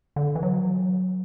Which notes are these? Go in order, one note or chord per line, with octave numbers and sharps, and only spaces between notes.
D3
E3
F#3